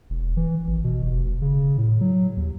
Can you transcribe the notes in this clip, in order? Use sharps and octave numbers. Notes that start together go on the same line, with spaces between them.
E1
E3
G#1
B2
F1
C#3
A2
F#3
D#2